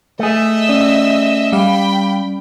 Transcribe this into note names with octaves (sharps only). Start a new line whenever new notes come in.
A3 G#4 D#5 E5
C#4 D5
G3 F5 G5 B5